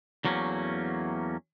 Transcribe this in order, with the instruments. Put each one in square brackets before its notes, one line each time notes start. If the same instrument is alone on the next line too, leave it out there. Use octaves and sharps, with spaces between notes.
[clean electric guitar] E2 F#3 A3 A#3 C#4